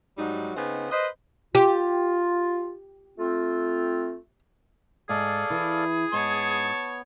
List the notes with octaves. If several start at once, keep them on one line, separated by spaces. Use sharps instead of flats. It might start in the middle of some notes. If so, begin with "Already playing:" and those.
G#2 F#3 G3 D#4
C#3 B3 C4 D#4
B4 C5 D#5
F4 G4
A3 C4 F4
G#2 G#4 A4 D5 F5
E3 E4
G#2 B3 C#5 A5 C#6